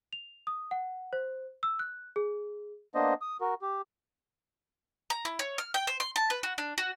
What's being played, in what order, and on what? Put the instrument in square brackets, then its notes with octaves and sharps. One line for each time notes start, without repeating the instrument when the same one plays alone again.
[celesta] F7
D#6
F#5
C5
E6
F#6
G#4
[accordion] A#3 B3 D4 C5 D#5
D#6
F#4 A#4
G4
[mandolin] A#5
E4
C#5
F6
G5
C5
C6
A5
B4
F#4
D4
F#4